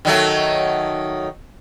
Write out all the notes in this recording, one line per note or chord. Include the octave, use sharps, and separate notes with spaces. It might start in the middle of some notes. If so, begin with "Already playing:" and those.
D#3 F#3 A3